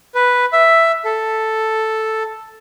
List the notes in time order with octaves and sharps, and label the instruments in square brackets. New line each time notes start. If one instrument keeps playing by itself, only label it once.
[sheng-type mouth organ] B4
E5
A4